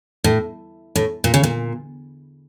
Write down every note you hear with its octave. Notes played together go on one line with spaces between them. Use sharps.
A2
A2
A#2
C#3
A#2